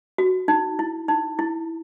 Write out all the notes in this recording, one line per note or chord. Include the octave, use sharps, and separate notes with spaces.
F#4
D#4
E4
D#4
E4